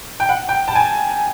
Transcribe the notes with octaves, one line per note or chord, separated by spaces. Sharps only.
G5
F#5
G5
A5
G#5